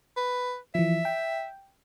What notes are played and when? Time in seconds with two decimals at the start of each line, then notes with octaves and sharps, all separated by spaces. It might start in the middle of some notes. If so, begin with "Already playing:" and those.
0.17 B4
0.75 E3 F3 E5
1.05 G5